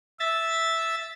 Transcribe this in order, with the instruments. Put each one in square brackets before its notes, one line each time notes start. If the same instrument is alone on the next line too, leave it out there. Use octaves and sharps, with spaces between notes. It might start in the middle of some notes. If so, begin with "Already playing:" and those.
[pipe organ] E5 A6